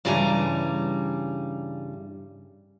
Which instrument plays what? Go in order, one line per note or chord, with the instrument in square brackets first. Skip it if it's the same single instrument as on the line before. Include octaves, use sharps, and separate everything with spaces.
[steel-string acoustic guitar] G2 C#3 E3 G3 G#5 A#5